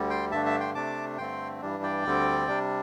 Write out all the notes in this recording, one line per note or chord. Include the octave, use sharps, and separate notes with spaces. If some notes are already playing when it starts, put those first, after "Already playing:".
Already playing: D2 D3 G3
G5 C6
G2 D3 A3 D4 E5 A5
E5 A5
G5 C6
C3 A3 D4 A5 D6
G2 D3 A3 C4 G5 C6
G2 E3 G3 D4
D5 G5
D2 D3 G3 C4
C3 G3 D4